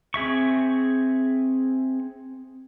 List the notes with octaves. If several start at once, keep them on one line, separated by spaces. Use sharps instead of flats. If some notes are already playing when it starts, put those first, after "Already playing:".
C4 G#4 E5 C#6